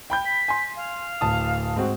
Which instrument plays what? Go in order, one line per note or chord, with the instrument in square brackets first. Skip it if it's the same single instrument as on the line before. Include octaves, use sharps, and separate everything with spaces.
[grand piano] G5 B5 G6
[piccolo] B6
[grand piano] G#5 C6
[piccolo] F5
[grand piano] D1 A5 D#6
G#2 C4 F#4